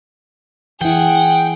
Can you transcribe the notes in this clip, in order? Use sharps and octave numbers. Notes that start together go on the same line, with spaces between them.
E3 E4 G#4 F#5 G5